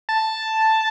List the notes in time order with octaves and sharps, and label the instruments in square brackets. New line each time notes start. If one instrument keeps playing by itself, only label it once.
[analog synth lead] A5